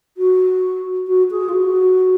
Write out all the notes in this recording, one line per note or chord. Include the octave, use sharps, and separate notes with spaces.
F#4
F#4
G#4
F4
F#4